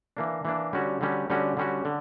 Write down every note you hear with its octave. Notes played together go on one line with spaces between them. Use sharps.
E3 A#3 D4
E3 A#3 D4
D3 G3 C#4 F#4
D3 G3 C#4 F#4
D3 G3 C#4 F#4
D3 G3 C#4 F#4
D3